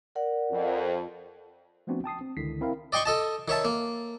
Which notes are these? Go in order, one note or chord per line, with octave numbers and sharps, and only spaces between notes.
A#4 D5 F#5
F2
F3 A3 B3 C4 D4 F#4
G5 A5 D#6 C7
C4
C#2 D3 D#3 E4 B6 C7
C4 E4 A#4 F5 G5
D5 D#5 G5 C6 C#6
A4 D#5 A5
D#3 C#5 E5 A5
A#3